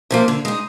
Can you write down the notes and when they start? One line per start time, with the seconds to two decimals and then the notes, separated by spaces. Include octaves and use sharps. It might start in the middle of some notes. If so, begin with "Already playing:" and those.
0.11 C3 F3 A#3
0.28 D3
0.45 G#3 D#4